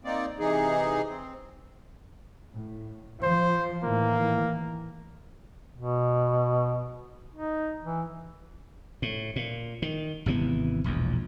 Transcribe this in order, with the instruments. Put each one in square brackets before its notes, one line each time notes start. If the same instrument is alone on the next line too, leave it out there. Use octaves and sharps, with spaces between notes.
[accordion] A#3 C4 D#4 D5
C3 E3 D#4 G#4
C4
[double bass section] A2
[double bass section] F3 [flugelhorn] C5
[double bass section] A2 D#3 E3 [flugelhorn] A#3
[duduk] B2
D#4
E3
[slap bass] A2
A#2
D#3
G#1 C3 E3 B3
E1 A#1 E2